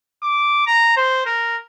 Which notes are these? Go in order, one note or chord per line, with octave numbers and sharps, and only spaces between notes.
D6
A#5
C5
A#4